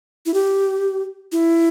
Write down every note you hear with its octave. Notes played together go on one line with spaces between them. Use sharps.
E4
G4
E4